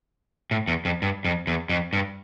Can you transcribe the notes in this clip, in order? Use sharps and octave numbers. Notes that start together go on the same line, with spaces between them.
A2
E2
F2
G2
F2
E2
F2
G2